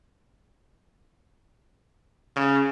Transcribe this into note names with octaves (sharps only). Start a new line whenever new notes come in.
C#3